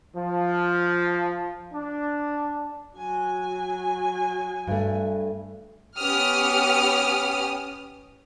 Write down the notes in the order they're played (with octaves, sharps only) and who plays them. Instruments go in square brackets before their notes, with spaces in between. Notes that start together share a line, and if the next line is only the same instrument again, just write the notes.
[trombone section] F3
D4
[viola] F#3 G#5
[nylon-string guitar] G2 A3
[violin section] B3 C#4 G4 D#6 F6